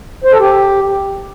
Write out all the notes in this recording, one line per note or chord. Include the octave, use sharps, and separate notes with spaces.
C5
A4
G4